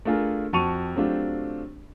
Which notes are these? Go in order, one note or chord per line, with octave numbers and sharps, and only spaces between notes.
A3 D4 F4 G#4 A#4
F2 F#4 A5 C#6 D#7 F7
F#3 A3 C4 D4 F4 G4